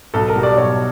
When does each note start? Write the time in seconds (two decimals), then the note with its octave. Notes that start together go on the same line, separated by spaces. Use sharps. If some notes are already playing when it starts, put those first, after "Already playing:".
0.14 B1 A4
0.29 A#4
0.35 B2 G3
0.43 D5
0.57 B1 C#5